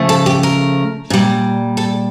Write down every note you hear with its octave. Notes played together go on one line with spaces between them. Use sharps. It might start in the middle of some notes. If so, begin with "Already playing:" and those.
Already playing: C#3 F3 A3
A4
G4
A#4
A#2 G3
A4